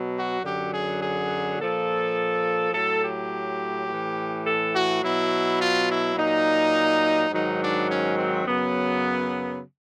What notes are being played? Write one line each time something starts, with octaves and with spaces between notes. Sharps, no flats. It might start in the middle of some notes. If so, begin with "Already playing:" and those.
Already playing: B2 F#3
F#4
F#2 D3 F#3 G4
G#4
G#4
A#2 F3 A4
A2 F#3 A4
G4
A2 E3
A4
F#4
B2 F#3 E4
F4
E4
A#2 F#3 D#4
G#2 D#3 F#3 D#4
D4
C#4
C4
F#2 C#3 F#3 B3